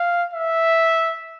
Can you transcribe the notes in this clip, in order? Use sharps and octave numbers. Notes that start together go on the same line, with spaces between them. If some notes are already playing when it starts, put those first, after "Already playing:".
Already playing: F5
E5